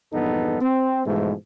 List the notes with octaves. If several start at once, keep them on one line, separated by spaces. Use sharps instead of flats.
A#1 E2 G2 B3 D#4 A4
C4
G#2 B2 E3 F3 G#3 A3